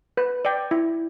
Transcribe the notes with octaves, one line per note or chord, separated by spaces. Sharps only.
B4
D5 G5
E4